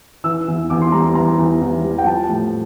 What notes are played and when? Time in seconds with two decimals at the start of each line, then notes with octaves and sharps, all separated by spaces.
0.24 E3 E6
0.48 E2
0.70 E2 D6
0.82 C6
0.92 G3 A#5
1.04 C6
1.15 E3 A#5
1.39 E2
1.62 E2
1.84 G3
1.98 G5
2.07 F3 A5
2.29 A2